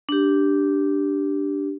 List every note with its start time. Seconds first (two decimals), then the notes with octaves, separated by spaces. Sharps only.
0.09 D4 G4